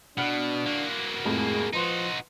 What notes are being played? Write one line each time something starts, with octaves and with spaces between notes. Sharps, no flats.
B2 D4 F#5 F6 C#7
A#3 F#4
F2 A2 G#3 G#4
F3 D#4 F#4 B4 C6